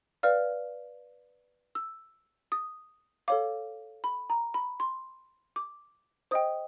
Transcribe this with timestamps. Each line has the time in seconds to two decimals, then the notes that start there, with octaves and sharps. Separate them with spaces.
0.23 B4 D5 F5 F6
1.75 E6
2.52 D#6
3.28 A4 C#5 F5 D6
4.04 B5
4.30 A#5
4.54 B5
4.80 C6
5.56 D6
6.31 C5 D#5 G5 D#6